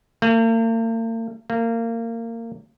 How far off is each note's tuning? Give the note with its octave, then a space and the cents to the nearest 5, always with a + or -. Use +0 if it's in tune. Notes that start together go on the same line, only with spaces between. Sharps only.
A#3 -45
A#3 -25